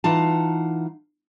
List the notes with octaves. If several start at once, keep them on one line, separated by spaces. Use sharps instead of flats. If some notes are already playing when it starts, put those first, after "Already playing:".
E3 D#4 F4 F#5 A5